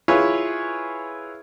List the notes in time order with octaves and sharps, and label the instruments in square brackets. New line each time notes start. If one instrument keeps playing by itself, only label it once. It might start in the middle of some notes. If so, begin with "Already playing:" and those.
[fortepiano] E4 F4 G#4 B4 C#5